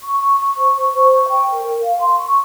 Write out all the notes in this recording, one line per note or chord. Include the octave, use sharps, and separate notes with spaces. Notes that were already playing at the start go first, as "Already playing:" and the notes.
C#6
C#6
C#6
C5
C#6
C5
C#6
G5
A#4
A#4
F5
C6
C#6